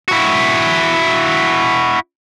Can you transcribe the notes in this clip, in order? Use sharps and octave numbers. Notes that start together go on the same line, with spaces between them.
E4 F#4